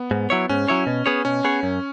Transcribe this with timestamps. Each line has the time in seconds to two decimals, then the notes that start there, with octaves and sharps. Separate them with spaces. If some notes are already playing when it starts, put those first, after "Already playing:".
Already playing: B3
0.11 G#2
0.30 F#3 E4 C#5
0.49 G#2 C#4
0.68 F#3 E4 C#5
0.87 B2
1.06 B3 G#4 C#5
1.25 B2 C#4
1.44 B3 G#4 C#5
1.63 F#2